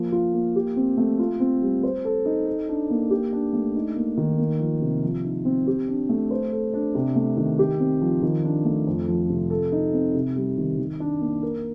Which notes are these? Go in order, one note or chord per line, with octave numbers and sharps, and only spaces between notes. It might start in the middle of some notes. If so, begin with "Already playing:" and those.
Already playing: F3 A#3
F4
A#3
G4
C4
A3
F4
C4
G3
C5
A4
D#4
A4
D4
A#3
G4
D4
A3
D#4
A#3
D#3
A#3
F3
C3
F3
D#4
C4
G4
D4
A3
C5
A4
D4
C3
A3
D#3
G4
C4
F3
D#3
D4
A3
F2
F3
C3
A4
D#4
C4
C3
G3
D#3
D#3
D4
A#3
A#4